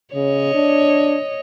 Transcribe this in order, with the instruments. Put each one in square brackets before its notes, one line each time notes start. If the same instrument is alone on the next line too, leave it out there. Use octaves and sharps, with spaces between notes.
[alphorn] C#3 [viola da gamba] C#5 D#5
[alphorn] D4